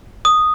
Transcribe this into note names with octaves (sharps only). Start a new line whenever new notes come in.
D#6